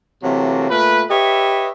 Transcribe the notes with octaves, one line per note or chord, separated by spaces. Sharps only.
C3 E3 F#3 A3 A#3
A#2 A3 A#4 B4
G4 B4 C#5 D#5 E5